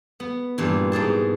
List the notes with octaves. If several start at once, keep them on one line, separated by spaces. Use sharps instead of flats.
B3
G2 A#2 E3
G#2 B2 G#4 A5